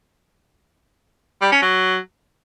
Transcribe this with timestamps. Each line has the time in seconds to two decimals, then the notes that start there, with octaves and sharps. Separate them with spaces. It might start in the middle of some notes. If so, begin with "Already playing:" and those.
1.42 G3
1.52 C#4
1.62 F#3